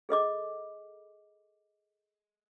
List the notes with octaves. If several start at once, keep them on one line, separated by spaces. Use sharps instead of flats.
G#4 A4 D#5 D6